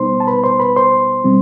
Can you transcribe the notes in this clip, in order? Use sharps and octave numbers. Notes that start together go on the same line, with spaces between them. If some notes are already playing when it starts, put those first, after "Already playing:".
Already playing: B2 G3 B3 D#4 C5 C6
A5
B4 B5
C5 C6
B4 B5
C5 C6
B2 G3 C4